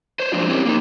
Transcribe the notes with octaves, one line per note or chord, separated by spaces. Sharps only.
C5 C#5
F3 F#3 G#3 A#3 D4 F4
C4 C#4 E4 G4 A#4
A#3 D#4